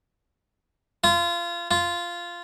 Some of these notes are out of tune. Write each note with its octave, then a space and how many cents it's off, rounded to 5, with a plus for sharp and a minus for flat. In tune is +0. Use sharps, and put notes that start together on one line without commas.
F4 -25
F4 -10